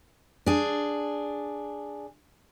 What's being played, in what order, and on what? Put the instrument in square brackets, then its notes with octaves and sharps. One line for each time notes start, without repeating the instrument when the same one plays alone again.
[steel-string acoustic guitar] D4 G#4